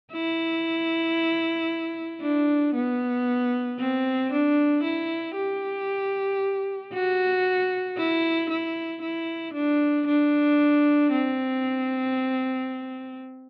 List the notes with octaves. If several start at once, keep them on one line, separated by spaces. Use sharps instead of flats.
E4
D4
B3
C4
D4
E4
G4
F#4
E4
E4
E4
D4
D4
C4